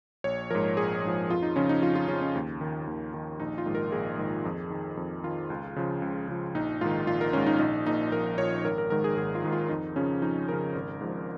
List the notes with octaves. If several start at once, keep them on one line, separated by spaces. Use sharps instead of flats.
A#1 C#5
G#2 F3 A#4
A#1 G#4
G#2 F3
F2 F4
D#4
C#3 F3 C#4
D#4
F2 F4
F4
C#3 C#4
F3
C#4
D#2
D#3
D#2
D#3
A#1 D#4
F4
G#2 D#3
A#4
A#1 G#4
G#2 D#3
F2
D#3
F2
D#3 F4
C#2
C#3 F3
C#2
C#3 F3
A#1 D#4
G#2 D#3 F4
A#1 F4
A#4
G#2 D#3 C#4
D#4
A#1 D#4
A#2 F3 D#4
A#1 A#4
A#2 F3 C#5
G#1 A#4
A#4
G#2 D#3 A#4
G#4
G#1 G#4
F4
G#2 D#3
F4
F2 D#4
C#3 F3 C#4
F2 D#4
C#3 F3 A#4
G#1
G#2 F3